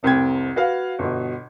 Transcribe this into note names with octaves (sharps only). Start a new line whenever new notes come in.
F1 C2 C4 G5 G#6
F#4 B4 F5
G1 B2